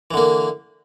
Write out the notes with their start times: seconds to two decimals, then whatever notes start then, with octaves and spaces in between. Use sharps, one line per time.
0.11 E3
0.14 D3
0.17 A#3